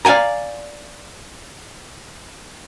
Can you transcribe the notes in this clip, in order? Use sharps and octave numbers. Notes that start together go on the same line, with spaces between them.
D5 F5 G5 G#5 A#5